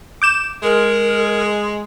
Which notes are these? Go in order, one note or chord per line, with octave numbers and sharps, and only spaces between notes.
D6 G6 E7
G#3 A#4